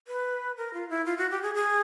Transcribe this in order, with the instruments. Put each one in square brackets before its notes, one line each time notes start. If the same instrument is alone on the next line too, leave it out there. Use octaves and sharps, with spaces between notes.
[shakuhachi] B4
A#4
F4
E4
F4
F#4
G4
G#4
G#4